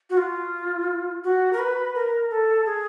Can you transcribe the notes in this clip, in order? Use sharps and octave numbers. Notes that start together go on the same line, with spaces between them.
F#4
F4
F#4
A#4
B4
A#4
A4
G#4